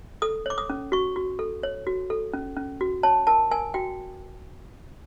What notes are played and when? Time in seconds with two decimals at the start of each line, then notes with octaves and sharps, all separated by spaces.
0.22 A4 D#6
0.46 C#5 D6
0.58 D#6
0.70 C#4
0.92 F#4 C#6
1.16 F#4
1.39 A4
1.63 C#5
1.87 F#4
2.10 A4
2.33 C#4
2.56 C#4
2.81 F#4
3.03 C#5 A5
3.27 A#4 A5
3.51 A#4 G#5
3.74 F#4 G5